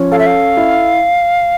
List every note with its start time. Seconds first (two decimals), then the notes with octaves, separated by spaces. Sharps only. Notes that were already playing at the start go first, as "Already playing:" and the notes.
Already playing: F3 C#4
0.12 A4 F5
0.19 E5
0.26 F5
0.57 E4